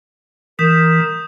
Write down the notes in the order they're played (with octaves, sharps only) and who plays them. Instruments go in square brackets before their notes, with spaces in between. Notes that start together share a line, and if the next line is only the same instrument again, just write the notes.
[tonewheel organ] E3 [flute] A#4 [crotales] D#6 G6